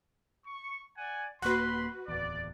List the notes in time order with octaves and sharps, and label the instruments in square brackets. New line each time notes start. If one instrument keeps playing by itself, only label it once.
[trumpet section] C#6
D5 F#5 G#5
[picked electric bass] D#1 A#3 [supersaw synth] F#4 B4 [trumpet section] B5 C6 [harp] F#6
[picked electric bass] D1 E2 [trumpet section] D5